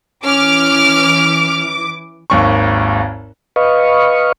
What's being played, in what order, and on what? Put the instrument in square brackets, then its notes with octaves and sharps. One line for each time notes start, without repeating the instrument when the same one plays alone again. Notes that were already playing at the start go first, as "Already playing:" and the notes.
[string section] E3 D6 [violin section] C#4 F6
[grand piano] G#1 D#2 C#6
[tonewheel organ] B4 D#5 F5 C#6